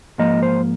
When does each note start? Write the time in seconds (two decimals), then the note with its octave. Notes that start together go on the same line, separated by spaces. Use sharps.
0.18 G#2 F3 A#3 D#5
0.43 C5